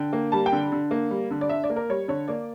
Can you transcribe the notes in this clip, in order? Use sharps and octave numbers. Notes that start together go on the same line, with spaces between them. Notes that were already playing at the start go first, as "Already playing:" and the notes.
Already playing: D3 G5
A#3
G3 A5
G5
D3
D3
A#3
G3
D3
D5
D3 E5
D5
A#3
A#4
G3 C#5
D3 C#5
A#3 D5